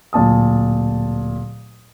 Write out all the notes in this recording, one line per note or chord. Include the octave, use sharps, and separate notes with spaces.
D1 A#2 A5 D#6